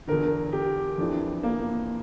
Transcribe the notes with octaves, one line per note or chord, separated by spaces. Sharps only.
E2 D3 A#4
G4
F2 E3 D4
A#3